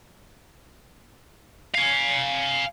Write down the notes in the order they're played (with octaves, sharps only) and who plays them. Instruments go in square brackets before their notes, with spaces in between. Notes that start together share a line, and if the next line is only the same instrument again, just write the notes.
[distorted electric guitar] F5 G#5